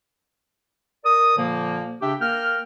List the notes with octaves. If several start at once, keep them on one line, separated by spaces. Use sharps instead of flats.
A#4 D5 D#6
A#2 D3 F3 A#3
C#3 D4 G4 E5 G5
A#3 A#4 G5 F6